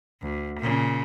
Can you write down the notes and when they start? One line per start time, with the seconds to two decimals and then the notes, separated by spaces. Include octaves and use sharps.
0.22 D2
0.60 A#2 C#3